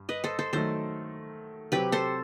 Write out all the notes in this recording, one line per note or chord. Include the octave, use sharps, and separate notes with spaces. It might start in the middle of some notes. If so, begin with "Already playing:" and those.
Already playing: G2
B4 D#5
A4 C5
A4 C5
D#3 F#3 A3 A4 C5
C3 F#3 C4 G4 B4
A4 C5